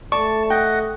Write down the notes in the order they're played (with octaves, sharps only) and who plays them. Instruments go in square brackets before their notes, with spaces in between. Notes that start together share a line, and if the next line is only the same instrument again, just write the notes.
[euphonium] A3 [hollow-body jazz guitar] D5 [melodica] A5 [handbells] C#6
[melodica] D#5 F#5 [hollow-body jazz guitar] G5